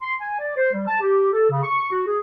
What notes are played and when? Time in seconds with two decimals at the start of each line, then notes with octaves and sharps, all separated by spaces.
0.02 C6
0.21 G#5
0.40 D5
0.57 C5
0.73 G3
0.87 A5
1.01 G4
1.32 A4
1.51 C#3
1.63 C#6
1.91 F#4
2.06 G#4